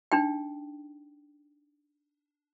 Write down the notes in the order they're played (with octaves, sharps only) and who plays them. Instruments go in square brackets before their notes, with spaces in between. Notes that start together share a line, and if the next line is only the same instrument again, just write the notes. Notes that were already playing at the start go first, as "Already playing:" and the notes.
[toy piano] D4 D#4 G5